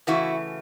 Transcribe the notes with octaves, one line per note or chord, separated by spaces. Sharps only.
C#3 E3 A3 E4 F#4